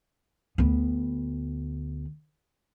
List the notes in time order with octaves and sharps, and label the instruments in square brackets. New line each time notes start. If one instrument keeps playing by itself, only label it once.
[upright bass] D2 B3